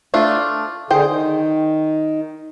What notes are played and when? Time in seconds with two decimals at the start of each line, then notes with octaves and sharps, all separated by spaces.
0.14 A3 D4 F4
0.90 D3 G#4 C5 G5
1.06 D#3